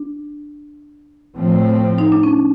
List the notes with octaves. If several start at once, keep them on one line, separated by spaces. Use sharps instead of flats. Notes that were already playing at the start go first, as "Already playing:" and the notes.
Already playing: D4
A2 F3 A3 C4
D#4
D4
C#4